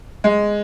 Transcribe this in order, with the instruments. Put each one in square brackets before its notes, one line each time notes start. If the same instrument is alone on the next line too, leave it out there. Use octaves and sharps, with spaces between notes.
[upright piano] G#3